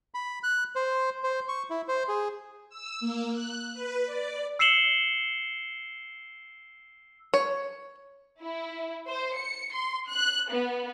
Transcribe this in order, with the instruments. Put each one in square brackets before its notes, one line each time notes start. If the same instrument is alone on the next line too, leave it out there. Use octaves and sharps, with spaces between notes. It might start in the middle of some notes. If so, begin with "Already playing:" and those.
[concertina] B5
F#6
C5
C5
C#6
E4
C5
G#4
[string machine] E6
A#3
F#6
B4
D5
[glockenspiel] E6 C7 C#7 E7 F#7 G7
[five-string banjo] C#5
[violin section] E4
C5
C#7
C6
F#6
B3